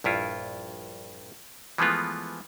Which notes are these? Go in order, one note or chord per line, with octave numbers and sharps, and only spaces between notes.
A#1 G2 E4 F4
E3 F3 G#3 A3 B3 F4